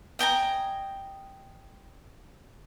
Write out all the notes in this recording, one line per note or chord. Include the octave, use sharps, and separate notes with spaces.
D#5 G5 G#5 A#5